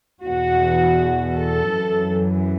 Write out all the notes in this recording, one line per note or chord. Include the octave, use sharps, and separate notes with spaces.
E2 B2 F#4
A4
F#2 E3